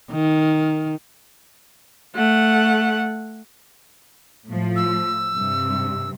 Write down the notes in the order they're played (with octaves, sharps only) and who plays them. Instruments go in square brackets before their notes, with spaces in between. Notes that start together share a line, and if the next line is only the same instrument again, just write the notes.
[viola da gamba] D#3
[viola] A3 F#5
[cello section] A2 F3
[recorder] E6
[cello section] G2 C3